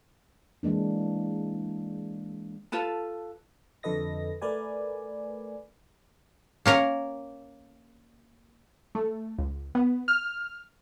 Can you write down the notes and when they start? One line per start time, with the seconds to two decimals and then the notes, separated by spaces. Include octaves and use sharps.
0.63 E3 G#3 A#3 D4
2.72 F4 A4 B4 A5
3.83 F2 D3 A4 B4 D#5 A#6
4.42 A3 A#4 B4 D5 G#5
6.66 A#3 C#4 A#4
8.95 A3
9.38 C#2
9.75 B3
10.08 F6